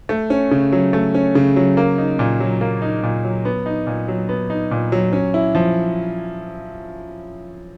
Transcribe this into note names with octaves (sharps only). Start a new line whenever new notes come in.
A3
C#4
C#3
F#3
A3
C#4
C#3
F#3
A#3
D#4
A#2
F#3
A#3
D#4
A#2
F#3
B3
D#4
A#2
F#3
B3
D#4
A#2
F#3
C#4
E4
F3